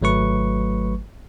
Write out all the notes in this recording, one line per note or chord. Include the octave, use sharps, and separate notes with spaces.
G#1 F#3 A3 B4 C#6